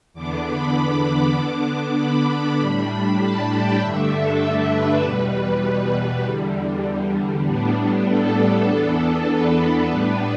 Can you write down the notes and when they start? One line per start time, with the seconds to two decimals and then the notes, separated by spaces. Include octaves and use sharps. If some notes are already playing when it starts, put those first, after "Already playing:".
0.14 E2 D3 B3 D4 D6
0.45 B5
0.75 D6
1.05 D6
1.36 D3 B3 D4
1.97 B5
2.58 A2 G3 D4
3.19 A5
3.50 G5
3.80 G2 D3 A3 D4 E5
4.10 A4
4.40 A4
4.72 B4
5.01 E2 B2 G3 B4
6.24 E2 D3 G3
7.45 A2 G3 B3 D4
8.07 A4
8.68 E2 E3 B3 D4
9.29 B4
9.58 A4
9.89 A2 G3 B3 D4 B4